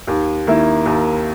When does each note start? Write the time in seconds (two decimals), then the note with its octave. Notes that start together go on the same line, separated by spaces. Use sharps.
0.07 D#2
0.47 D#3 A#3 E4
0.85 D#2